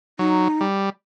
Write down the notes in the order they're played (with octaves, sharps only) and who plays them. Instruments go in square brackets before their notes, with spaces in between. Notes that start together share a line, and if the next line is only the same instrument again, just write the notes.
[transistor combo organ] F#3 [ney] D#4
[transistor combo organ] G3